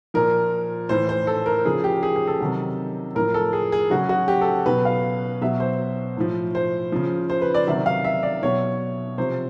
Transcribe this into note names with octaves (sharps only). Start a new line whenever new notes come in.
A#2 F3 A#4
A2 E3 C5
C5
A4
A#4
C#3 F3 G#4
G4
G#4
G#4
A4
C3 D#3 F#3
A2 F3 A#4
A4
G#4
G#4
C#3 F#3 F#4
F#4
G4
A4
B2 F#3 B4
F5
B2 F#3 E5
C5
A2 F3
C5
C#3 F3
C5
B4
D5
C3 D#3 F#3 E5
F5
E5
D5
B2 F#3 C#5
C3 F3 C5